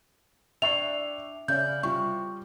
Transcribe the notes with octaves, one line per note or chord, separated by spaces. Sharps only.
D4 E4 E5 G5 C#6 C7 F7
C#3 E4 D5 G6
C3 G3 F4 C#6